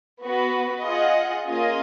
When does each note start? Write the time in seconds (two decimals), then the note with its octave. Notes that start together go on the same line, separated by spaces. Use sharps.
0.21 B3 F#4 B4
0.84 F4 G#4 D#5 F#5
1.47 A#3 C#4 F4 G#4 D#5